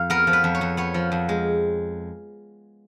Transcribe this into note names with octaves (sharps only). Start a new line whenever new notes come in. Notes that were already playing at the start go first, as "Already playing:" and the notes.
Already playing: F2 F5
B3 A#4
F3
B4
F2
C#5
F2
B3 C#5
F3
F2
G#3